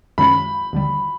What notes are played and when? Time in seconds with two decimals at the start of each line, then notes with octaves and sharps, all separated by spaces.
0.18 F#2 D#3 G#3 C#4 B5
0.73 D#2 D3 G3